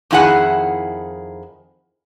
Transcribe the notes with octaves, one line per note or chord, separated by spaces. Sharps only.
F2 D#3 E4 G#4 F#5